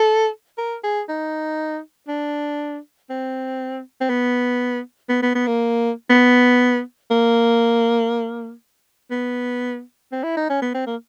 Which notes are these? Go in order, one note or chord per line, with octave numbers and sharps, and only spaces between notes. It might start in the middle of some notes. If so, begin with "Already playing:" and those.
Already playing: A4
A#4
G#4
D#4
D4
C4
C4
B3
B3
B3
B3
A#3
B3
A#3
B3
C4
E4
D#4
C#4
B3
C4
A#3